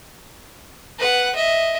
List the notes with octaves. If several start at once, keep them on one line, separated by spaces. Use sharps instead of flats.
B4 F#5
D#5 E5